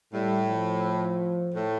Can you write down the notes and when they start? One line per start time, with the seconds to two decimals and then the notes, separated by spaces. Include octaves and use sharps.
0.13 A2 G3
0.48 F3
1.54 A2